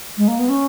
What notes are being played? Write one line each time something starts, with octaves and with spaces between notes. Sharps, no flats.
G#3
A#3
B3
C#4